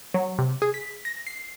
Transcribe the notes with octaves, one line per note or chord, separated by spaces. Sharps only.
F#3
C3
G#4
B6
A#6
C7